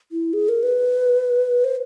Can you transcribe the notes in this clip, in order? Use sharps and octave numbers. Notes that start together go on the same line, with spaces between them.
E4
G#4
A#4
B4
C5